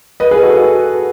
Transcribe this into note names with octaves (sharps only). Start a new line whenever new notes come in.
B4 D#5
G#4 B4
F#4 A4
F#4 A4